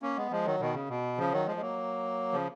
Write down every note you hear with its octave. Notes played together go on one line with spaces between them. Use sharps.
A#3 C#4
G#3 B3
F3 G#3
D#3 F#3
B2 D#3
C#3
B2
C#3 F3
D#3 F#3
F3 G#3
G#3
F#3 A#3
C#3 F3